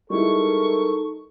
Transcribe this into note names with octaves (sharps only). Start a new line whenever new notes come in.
G3 G#3 D#4 E4 A4 A#4 C#6